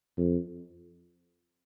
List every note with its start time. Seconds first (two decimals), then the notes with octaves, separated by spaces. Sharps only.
0.17 F2